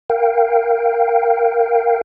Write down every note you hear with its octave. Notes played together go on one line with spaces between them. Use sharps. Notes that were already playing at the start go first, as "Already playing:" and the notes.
A#4 F5 G5